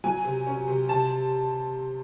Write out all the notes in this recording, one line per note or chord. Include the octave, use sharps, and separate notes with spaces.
F#3 G#5
C3
C#4
C3
C3 A5